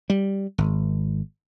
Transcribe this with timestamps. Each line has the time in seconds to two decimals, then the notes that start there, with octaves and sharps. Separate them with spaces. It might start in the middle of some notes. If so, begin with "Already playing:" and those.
0.10 G3
0.58 G#1